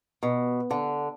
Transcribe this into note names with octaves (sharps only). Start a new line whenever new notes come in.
B2
D3